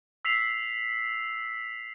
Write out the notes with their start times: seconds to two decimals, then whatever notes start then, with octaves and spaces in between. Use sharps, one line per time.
0.25 E6 B6 C7 F7